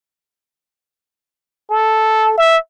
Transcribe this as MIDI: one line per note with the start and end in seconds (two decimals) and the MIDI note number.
1.70 2.37 69
2.38 2.57 76